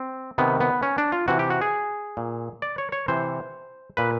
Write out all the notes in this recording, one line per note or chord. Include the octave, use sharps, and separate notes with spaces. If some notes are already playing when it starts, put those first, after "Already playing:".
Already playing: C4
C3 D#3 B3
B3
C#4
D4
F4
C3 E3 F#4
G4
F#4
G#4
A#2
D5
C#5
C#5
C3 E3 C5
A#2 B4